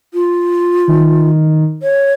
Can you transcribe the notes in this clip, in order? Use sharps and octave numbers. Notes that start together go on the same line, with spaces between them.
F4
D#3
C#5